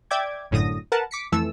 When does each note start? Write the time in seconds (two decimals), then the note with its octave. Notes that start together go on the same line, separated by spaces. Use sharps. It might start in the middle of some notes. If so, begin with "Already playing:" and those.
0.11 D5 E5 G5 D6 G#6
0.51 G1 F#2 A2 D3 D#6 A#6
0.92 A#4 B4 F#5 A5
1.11 D6 B6 C#7
1.32 F2 E3 A3 A4 E6